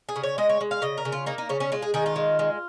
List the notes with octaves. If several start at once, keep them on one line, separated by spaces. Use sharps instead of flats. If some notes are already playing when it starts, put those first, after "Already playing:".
G#4
C#3
C#5
G#3 D#5
C#5
G#3
F5
C#3 D#5
A#4
C#3
F4
A#3 D#4
D#4
C#3 C#4
C#4
G#3 F4
G#4
D#3 G#4
F4
G#3
G#3